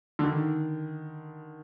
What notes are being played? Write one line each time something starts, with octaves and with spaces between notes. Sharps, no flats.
D3
D#3